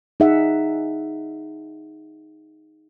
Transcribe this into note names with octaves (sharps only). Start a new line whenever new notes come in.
D#4 G#4 E5 F#5